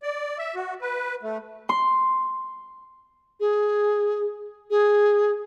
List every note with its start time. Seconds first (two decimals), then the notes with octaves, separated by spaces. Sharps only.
0.03 D5
0.38 E5
0.55 F#4
0.81 B4
1.23 A3
1.69 C6
3.40 G#4
4.70 G#4